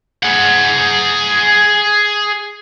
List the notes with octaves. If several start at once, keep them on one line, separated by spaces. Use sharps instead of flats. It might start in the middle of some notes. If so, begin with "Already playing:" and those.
G#4 F#5